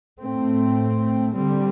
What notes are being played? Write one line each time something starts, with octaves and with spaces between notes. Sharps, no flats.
A2 A3 C4
D3 G3 C4